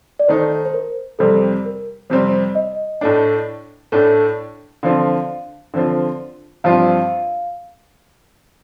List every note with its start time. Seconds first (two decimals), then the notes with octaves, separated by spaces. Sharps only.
0.19 D5
0.28 D#3 A3 D#4 C5
0.66 C5
0.74 A#4
1.19 F2 C3 G3 C4 A4
1.65 A#4
2.10 F2 C3 G3 C4 C5
2.55 D#5
3.01 A2 A3 D4
3.92 A2 A3 D4
4.83 D3 F3 C4 F4 F5
5.74 D3 F3 C4 F4
6.64 G2 F3 C4 F4 F5